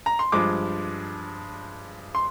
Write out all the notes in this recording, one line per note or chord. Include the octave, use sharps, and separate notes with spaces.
A#5
C6
G2 F3 G#3 D6
C6